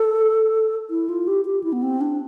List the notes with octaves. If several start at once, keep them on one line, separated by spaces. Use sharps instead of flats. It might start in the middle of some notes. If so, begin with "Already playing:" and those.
Already playing: A4
E4
F4
G4
G4
E4
B3
C4
D4